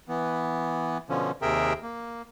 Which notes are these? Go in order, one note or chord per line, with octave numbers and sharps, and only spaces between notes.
E3 B3
B2 D3 F3 C#4
D#2 C3 G#4 A#4 E5 G5
A#3